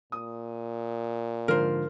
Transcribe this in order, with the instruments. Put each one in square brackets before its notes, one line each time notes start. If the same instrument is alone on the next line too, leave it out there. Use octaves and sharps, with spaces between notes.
[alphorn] A#2 [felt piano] D#6
[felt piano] G#2 D3 F3 [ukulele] A#4 C5